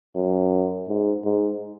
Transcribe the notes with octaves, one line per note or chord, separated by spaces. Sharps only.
F#2
G#2
G#2